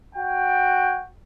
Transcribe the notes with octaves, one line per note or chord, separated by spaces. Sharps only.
F#4 G5